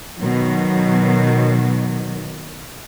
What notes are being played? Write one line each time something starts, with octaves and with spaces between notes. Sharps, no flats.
B2 D#3 F#3